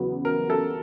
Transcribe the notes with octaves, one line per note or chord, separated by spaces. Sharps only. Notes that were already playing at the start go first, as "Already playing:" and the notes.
Already playing: E2 C#3 F#3 B3
A#4
A4